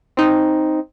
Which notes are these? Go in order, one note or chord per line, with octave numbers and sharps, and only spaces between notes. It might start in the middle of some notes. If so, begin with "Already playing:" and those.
C4 D#4